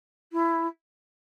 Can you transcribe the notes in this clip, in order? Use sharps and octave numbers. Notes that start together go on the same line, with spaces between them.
E4